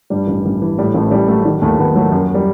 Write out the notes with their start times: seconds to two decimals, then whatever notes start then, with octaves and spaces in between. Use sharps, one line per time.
0.10 G2 G3
0.27 A1
0.45 A1
0.62 E3
0.78 A2 G3
0.94 A1 A3
1.11 A1 G3
1.28 F#3 A3
1.45 D#3 G3
1.62 D#2 A3
1.78 D#2 B3
1.96 F#3 A3
2.12 F#2
2.34 G3